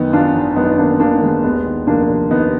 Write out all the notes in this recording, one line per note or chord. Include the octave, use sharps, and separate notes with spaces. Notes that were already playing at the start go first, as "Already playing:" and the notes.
Already playing: F#2 D#3 B3 D#4
G#1 D4 F4
G#1
F#2 B3 D#4
D#4
D#3 A#3 D4
G#1 A#3 D4
G#1 G#3 B3
D#2 G#3 B3
D#3
F1 A#3 D4
F1
D#2 B3 D#4